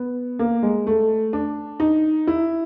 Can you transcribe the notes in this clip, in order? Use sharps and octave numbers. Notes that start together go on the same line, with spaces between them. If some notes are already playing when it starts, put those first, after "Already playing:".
Already playing: B3
A#3
G#3
A3
D4
D#4
E4